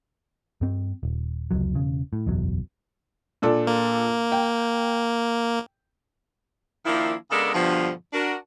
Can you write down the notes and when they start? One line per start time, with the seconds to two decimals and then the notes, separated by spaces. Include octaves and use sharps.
0.61 G2 C4
1.03 D#1
1.51 F1 C#2 F#3
1.75 E1 C#3
2.13 A2
2.26 F#1 B1 E2 F#3
3.42 A#2 D4 A4
3.67 A#3
4.32 G5
6.85 D#3 F3 A#3 D4 E4
7.31 C#3 G#3 B3 D4 A4 A#4
7.53 G2 B2 D3 F3
8.13 D4 F#4 A#4